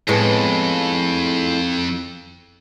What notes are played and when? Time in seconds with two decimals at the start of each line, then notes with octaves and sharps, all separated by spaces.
0.08 F2 A2 G#3 B3